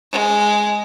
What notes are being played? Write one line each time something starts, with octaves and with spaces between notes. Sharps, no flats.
G#3